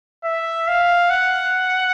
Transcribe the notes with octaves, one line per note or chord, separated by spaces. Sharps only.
E5
F5
F#5